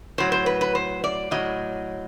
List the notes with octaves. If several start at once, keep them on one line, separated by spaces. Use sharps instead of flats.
A2 F#3 C5
C5
B4
B4
C5
D5
A2 F#3 D#5